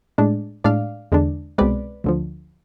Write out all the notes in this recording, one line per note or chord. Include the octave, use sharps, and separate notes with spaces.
A2 G#3 D4
A2 G#3 D4 D5 F5
E2 D3 G#3 D4
C2 B2 G#3 C4 B4 D5
D2 D3 F3